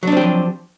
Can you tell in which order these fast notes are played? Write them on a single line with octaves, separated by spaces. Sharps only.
F#3 D4 C4 G4 F3